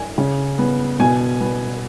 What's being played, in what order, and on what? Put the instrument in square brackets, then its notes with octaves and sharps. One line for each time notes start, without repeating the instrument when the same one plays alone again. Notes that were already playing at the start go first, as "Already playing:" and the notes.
Already playing: [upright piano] G#5
C#3
B3
B2 G#5
B3